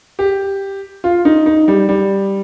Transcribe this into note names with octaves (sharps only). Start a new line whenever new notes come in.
G4
F4
D#4
D#4
G3
G3